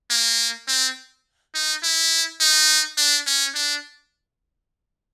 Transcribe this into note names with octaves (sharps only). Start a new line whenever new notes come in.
A#3
C4
D#4
E4
D#4
D4
C#4
D4